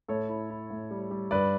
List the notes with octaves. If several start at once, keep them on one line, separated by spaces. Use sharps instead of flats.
A2 A4 C#5
E4
E4
A2
G3
G3
G2 B4 D5